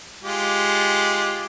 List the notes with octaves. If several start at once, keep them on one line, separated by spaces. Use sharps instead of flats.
G#3 F4 G4